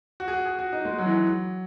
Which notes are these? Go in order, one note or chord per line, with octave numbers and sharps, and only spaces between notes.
F#4
G#4
F#4
G#4
F#4
D#4
G#3
F#3
E3
F#3